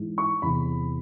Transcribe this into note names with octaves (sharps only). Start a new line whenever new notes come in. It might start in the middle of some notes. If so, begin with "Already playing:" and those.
Already playing: G#2 E3
C#6
E2 C3 E3 B5